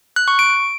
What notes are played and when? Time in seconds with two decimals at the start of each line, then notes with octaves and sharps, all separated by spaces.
0.16 F#6
0.28 C#6
0.39 D7